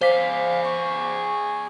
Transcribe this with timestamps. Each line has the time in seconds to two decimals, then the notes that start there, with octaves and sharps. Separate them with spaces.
0.01 G#4 C5 D5 F5 B6
0.64 C#6